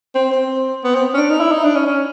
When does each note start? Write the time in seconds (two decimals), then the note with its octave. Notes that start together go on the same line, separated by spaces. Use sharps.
0.15 C4
0.32 C4
0.84 B3
0.94 C4
1.14 C#4
1.17 D4
1.30 D#4
1.40 E4
1.52 D#4
1.64 D4
1.75 C#4
1.86 C#4